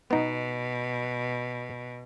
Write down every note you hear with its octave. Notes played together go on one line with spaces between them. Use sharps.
B2 B3 D#4